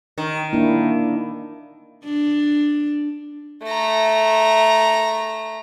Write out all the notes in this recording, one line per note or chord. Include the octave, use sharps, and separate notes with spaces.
D#3
A#3 D4 E4
D4
A3 A#5